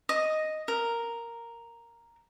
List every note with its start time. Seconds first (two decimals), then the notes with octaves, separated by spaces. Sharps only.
0.09 D#5
0.68 A#4